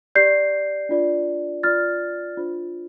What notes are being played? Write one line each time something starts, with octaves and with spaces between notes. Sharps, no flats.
G4 D5 G6 C7
D4 F4 D5
F4 D5 F6 A6
D4 F4 C5